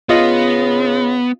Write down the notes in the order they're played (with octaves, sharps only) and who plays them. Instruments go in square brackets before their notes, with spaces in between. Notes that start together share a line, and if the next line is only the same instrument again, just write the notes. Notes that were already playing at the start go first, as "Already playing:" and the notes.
[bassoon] C#3 [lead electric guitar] B3 [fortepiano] F4 D#5